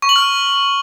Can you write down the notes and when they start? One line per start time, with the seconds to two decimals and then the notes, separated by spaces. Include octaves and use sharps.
0.02 C#6
0.09 F#7
0.16 F6